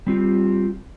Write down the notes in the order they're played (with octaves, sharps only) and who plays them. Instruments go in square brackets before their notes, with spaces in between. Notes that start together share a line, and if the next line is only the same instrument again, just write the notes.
[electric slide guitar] G3 C4 F4 G4